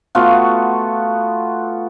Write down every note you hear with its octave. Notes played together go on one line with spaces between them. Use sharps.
A3 B3 F4 F#4